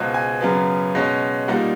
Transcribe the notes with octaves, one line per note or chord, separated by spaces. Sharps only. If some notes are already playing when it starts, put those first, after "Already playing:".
Already playing: C#2 B2 G#3 C4
G#5
F#2 C#3 F#3 B3
B2 G#3 C#4
A#2 G3 A#3 D#4 F#5